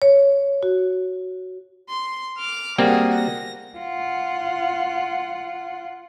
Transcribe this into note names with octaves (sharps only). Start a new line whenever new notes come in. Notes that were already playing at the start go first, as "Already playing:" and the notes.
C#5
F#4
C6
D6 F6
G3 A#3 C4 F#4 G#4
A#6
F4 F#5